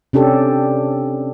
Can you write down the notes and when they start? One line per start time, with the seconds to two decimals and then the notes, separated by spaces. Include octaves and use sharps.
0.13 C3 C#4 D4 G4 A4